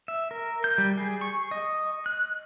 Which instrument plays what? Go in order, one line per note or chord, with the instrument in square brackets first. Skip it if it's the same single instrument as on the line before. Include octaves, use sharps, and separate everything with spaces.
[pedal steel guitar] E5
A#4
G6
G3
G#4
C#6
D#5
F#6